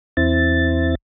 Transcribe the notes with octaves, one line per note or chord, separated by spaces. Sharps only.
E2 C4 E4 A6